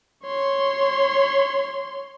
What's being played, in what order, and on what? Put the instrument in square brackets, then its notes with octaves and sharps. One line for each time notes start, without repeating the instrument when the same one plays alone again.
[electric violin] C#5 C6